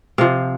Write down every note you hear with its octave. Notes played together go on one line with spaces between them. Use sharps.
C3 F3 F5